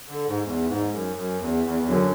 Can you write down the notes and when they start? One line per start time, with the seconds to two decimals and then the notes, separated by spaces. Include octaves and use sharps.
0.08 D3
0.26 G#2
0.44 E2
0.68 G#2
0.92 F#2
1.15 F#2
1.40 E2
1.64 E2
1.79 E2
1.88 F#2 D3 F#3 C#4